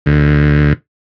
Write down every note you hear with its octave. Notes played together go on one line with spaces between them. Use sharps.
D2